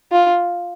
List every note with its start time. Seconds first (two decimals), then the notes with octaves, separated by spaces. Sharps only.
0.12 F4